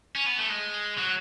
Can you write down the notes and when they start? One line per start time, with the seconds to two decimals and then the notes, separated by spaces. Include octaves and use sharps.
0.15 C#4
0.26 B3
0.38 A3
0.50 G#3
0.98 F#3